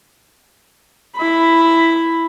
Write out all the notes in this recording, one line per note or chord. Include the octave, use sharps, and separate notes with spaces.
E4 B5